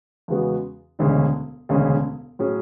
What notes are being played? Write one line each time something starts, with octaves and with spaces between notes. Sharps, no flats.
E2 C#3 G#3 B3 F#4
E1 D2 C#3 G#3 C#4
E1 D2 C#3 G#3 C#4
A2 F#3 C#4 G#4